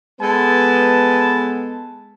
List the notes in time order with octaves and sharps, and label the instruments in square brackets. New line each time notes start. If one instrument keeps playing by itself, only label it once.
[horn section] G#3 B3 A4 B4 A5